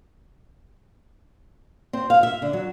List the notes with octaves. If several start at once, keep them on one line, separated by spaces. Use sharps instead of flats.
C4
F5
E5
D3
F#3